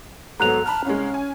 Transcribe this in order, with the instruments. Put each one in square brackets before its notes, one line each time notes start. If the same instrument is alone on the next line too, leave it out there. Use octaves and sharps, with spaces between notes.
[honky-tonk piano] G#2 F#3 B3 [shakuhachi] A4 [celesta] A#5 F#6 F7
[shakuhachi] A5 [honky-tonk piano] B5 F6
[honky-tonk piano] C2 G#3 [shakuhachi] C#4
[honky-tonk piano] G#5